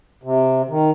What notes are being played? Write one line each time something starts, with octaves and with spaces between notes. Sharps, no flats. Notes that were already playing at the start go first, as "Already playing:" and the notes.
C3
D#3